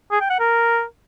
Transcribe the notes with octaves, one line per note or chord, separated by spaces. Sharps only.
G#4
G5
F#5
A#4